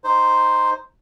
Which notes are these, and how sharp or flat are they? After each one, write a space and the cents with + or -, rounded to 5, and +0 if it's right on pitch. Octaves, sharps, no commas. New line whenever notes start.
D#4 +0 C5 +0